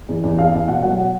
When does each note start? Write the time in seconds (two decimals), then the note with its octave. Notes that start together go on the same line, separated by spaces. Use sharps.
0.09 E2
0.23 E2
0.38 E2 F5
0.53 E2 F5
0.68 B2 F#5
0.82 F#3 F#5